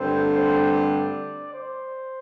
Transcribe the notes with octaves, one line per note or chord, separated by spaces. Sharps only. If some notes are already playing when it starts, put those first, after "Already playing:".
Already playing: G2 D3 A3 C4 C5
C5
D5
C5